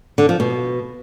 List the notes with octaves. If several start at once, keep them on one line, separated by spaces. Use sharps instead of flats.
D3
F3
B2